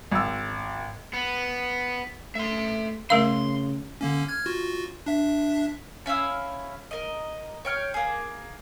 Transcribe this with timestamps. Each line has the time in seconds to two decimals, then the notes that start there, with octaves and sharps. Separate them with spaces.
0.12 G#1 E6
1.13 B3
2.35 A3 E5 C6
3.10 C#3 A3 A#4 F5 C6
4.01 D3 A#3 C#4
4.28 F6 G#6
4.46 F4 F#4
5.06 D4 E5
6.06 C#4 E4 F5 E6
6.91 A#4 D#5
7.65 C#5 G5 F6
7.94 A#3 G#4